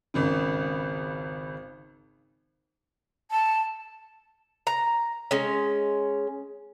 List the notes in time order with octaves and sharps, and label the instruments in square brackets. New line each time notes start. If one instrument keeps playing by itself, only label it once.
[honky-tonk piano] G#1 C#2 C#3
[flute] A5
[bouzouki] A#5
G#3 C#4